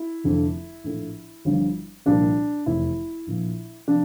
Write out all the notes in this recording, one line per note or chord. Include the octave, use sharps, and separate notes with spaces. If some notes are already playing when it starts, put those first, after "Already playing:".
Already playing: E4
F1 F2 D3 F3
A#1 A2 F3
G1 G2 F3
C2 A#2 F3 D4
F1 E2 E3 E4
A#1 A#2 F3
C3 F3 D4